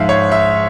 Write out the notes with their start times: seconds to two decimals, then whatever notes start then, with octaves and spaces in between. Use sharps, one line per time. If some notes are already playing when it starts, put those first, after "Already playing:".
Already playing: G#2 F3 G#3 E5 F5
0.09 C#5
0.32 E5